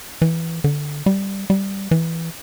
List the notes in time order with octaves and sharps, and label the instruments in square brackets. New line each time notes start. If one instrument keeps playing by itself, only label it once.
[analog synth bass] E3
D3
G3
G3
E3